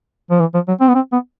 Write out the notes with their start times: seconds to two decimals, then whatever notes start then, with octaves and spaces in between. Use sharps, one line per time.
0.30 F3
0.40 E3
0.54 F3
0.68 F#3
0.80 C4
0.88 B3
0.95 C4
1.12 B3